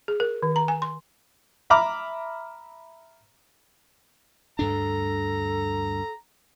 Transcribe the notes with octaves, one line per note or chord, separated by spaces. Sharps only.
G#4
A#4
D#3
A#5
G#5
C6
E5 A#5 B5 D6 F6
D2 G2 D4 A4 A#5